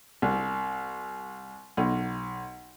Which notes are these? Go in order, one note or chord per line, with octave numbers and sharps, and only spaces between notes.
C2
B1